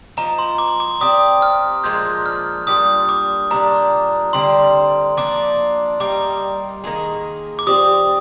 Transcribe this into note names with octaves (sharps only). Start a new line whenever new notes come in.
F3 A#3 D#4 A#5
C6
D6
D6
C4 G4 D5 D#6
F6
A#2 F3 G#3 D4 G6
F6
A#2 G3 D4 D#6
D6
A#2 G3 D4 A#5
D3 G3 C4 C6
F3 A#3 D4 D6
G3 A#3 D#4 D6
D#3 A#3 D#4 G#4
D6
F3 C4 G4 D5 D#6